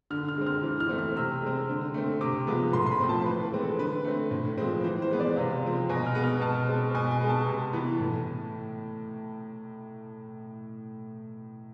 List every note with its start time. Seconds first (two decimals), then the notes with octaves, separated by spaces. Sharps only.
0.10 D3 F6
0.29 F6
0.37 G#3 C4
0.46 F6
0.63 E3
0.80 F6
0.89 A3 C4
0.98 F6
1.16 C3 E6
1.42 G#3 C4
1.69 D3
1.94 A3 C4
2.21 C3 D6
2.47 F3 G#3 B3
2.73 A2 C6
2.86 C6
2.91 B5
3.00 F3 A3 C4
3.09 A5
3.26 E3 B4
3.43 B4
3.52 G#3 C4
3.61 A4
3.79 D3 B4
4.05 A3 C4
4.31 A2
4.58 F3 G#3 C4
4.84 E3 C5
5.02 C5
5.11 G#3 B3
5.20 D5
5.36 C3 F5
5.62 F3 G#3 C4
5.89 B2 G#5
6.06 F6
6.15 G#3 B3
6.24 F6
6.41 B2 A5
6.68 G#3 C4
6.95 B2 G#5
7.11 G#5
7.21 G#3 B3
7.29 A5
7.46 C3
7.73 E3 B3
8.00 A2